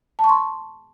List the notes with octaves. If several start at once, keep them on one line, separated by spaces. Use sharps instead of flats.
A5
C#6
C6